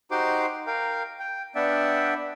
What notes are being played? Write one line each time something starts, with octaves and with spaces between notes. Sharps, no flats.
D#4 F#4 G4 C5 C6 D6
A#4 F5 G5
G5
B3 D4 D5 E5 F#5 G5